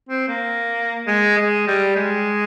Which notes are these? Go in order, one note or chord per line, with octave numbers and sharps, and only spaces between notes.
C4
A#3
G#3
G#3
G3
G#3